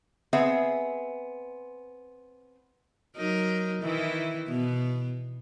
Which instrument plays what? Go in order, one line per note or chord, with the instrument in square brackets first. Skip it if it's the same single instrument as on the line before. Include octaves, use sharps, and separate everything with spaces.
[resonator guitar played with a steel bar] B3 C4 G#4 E5
[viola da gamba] F#3 D#4 A#4
D#3 E3 E4
B2 B3